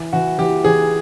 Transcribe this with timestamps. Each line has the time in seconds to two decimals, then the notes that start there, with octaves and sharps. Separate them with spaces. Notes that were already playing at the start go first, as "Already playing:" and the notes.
Already playing: E3
0.13 E3 F#4
0.38 E3 G4
0.64 E3 G#4